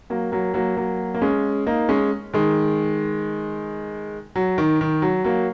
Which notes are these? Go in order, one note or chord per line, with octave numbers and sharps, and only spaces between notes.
F#3 A#3
F#3 A#3
F#3 A#3
F#3 A#3
A#3
G#3 C#4
A#3 D#4
G#3 C#4
D#3 G#3
F#3
D#3
D#3
F#3
F#3 A#3